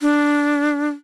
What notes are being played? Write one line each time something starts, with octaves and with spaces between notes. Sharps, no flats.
D4